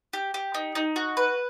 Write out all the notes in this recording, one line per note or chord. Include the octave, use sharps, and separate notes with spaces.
G4
G4
D#4
D#4
F#4
B4